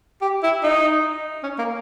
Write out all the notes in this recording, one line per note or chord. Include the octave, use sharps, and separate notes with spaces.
G4
E4
D#4
C#4
A#3